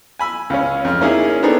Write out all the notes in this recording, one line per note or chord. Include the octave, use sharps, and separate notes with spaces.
G#5 B5 E6
C#2 C#4
F2 F6
A#3 C#4 D#4 E4 G#4
B3 C4 D4 D#4 G#4 A4